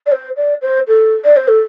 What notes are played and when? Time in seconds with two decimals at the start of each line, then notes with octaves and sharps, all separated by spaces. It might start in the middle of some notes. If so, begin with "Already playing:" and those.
0.06 D5
0.12 C5
0.36 D5
0.62 C5
0.87 A4
1.24 D5
1.36 C5
1.48 A4